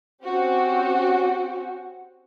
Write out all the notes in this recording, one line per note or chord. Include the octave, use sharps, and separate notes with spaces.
C4 C#4 F#4 G4